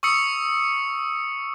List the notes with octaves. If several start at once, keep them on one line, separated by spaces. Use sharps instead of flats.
C#6 D#6 E6 C#7